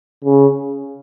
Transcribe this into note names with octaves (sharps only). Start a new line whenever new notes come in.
C#3